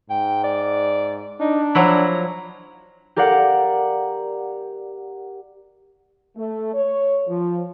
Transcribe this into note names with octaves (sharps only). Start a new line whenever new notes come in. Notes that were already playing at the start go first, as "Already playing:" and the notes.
G#2 G5
D5
D4 D#4
F3 F#3 E4 A#5
G4 A#4 D5 F5 F#5
A3
C#5
F3